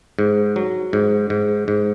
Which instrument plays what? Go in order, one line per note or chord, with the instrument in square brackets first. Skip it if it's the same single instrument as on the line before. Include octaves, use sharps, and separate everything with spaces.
[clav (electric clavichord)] G#2
F#3
G#2
G#2
G#2